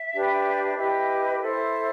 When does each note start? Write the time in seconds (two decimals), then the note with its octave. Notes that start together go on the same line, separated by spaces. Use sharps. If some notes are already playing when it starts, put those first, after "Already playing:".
Already playing: E5
0.14 D4 G4 B4
0.77 E4 G4 B4 D#5
1.39 E4 A4 C5